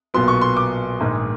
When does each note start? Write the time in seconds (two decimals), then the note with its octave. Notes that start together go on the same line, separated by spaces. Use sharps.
0.14 B1 A#2 F#3 B3 C6
0.28 C#6
0.41 C6
0.56 D6
1.00 A#1 G#2 D#3 G#3